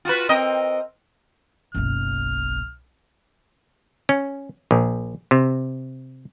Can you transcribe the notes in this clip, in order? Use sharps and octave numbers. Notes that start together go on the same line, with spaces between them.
F4 F#4 B4
C4 A#4 D#5
F#1 B1 F6
C#4
A#1
C3